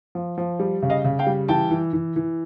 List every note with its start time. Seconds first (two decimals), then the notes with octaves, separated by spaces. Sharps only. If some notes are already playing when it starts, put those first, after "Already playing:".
0.15 F3
0.38 F3
0.60 G3
0.82 C#3
0.90 D#5 F5
1.04 C#3
1.19 F5 G5
1.27 G3
1.48 E3 G5 A5
1.71 E3
1.93 E3
2.16 E3